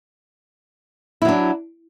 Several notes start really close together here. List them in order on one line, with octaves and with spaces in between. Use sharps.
E4 F#3 D4